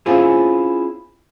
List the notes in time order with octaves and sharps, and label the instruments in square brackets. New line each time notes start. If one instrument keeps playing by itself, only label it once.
[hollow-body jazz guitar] C4 C#4 E4 F4 G#4